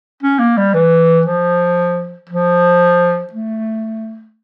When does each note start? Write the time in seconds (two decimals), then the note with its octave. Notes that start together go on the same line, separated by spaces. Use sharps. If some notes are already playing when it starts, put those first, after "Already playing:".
0.23 C#4
0.39 A#3
0.58 G3
0.74 E3
1.26 F3
2.30 F3
3.33 A3